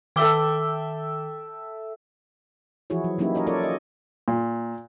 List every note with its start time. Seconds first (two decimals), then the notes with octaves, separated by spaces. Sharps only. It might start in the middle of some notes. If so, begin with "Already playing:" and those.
0.16 D#3 A4 E5 G5 D6 G7
2.90 E3 F3 E4 F#4 G#4 C#5
3.04 F#3
3.19 F#3 A#3 C#4 D#4 E4 G4
3.35 A#4 C#5 D#5
3.47 C#4 F4 A4 A#4 C#5 D5
3.63 D#5
4.28 A#2